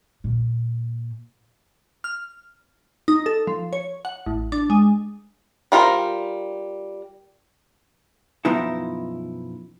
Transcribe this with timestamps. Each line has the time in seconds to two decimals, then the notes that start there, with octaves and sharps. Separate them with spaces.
0.24 A#2
2.04 F6
3.08 D#4
3.26 A4
3.47 F3
3.73 C#5
4.05 F#5
4.26 A1
4.52 D4
4.70 G#3
5.72 G3 F4 A#4 C5
8.45 B1 F#2 F3 B3 D#4 E4